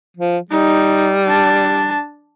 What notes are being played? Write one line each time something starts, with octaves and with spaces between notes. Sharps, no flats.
F3
G3 D#4
D4 A5